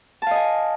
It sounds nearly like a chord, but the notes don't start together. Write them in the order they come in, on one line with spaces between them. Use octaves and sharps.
A5 F5 D#5 G#5